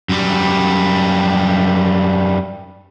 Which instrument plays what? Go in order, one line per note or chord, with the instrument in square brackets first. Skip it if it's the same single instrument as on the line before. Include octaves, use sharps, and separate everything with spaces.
[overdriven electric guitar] F#2 G3